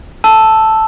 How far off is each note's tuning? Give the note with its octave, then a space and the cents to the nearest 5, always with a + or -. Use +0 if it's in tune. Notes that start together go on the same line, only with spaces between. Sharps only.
A5 +0 E6 +0